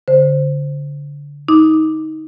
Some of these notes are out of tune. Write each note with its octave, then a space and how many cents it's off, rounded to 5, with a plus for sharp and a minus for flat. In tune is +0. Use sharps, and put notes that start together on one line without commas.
D3 -25 C5 -5
D#4 +20 D6 +10